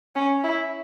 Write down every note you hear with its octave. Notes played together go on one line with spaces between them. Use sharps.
C#4
E4